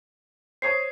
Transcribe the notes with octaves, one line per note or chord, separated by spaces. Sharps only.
C5 C#5 D#6 C7